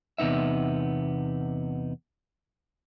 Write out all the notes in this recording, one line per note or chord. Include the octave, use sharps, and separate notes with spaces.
E2 C3 B3 D#4 E5